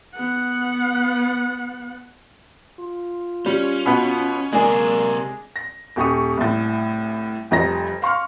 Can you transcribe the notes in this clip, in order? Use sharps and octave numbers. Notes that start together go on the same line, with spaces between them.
B3 F#5
F4
G3 C#4
B2 B3
C3 G#3 A#3 D4 G#4 A#4
A#6
D#1 G4 C#6 D#6
C2 A2
F1 F2 G3 D#5 A#5 A#6
F5 C6 C#6 F6